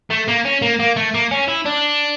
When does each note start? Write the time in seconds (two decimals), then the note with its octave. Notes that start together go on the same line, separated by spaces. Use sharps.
0.10 A3
0.28 A#3
0.45 C#4
0.62 A#3
0.80 A#3
0.96 A3
1.14 A#3
1.31 C#4
1.48 E4
1.66 D4